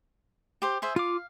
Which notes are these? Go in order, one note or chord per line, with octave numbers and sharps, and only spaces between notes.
G4 C5
G#4 C5 E5
F4 F5 D6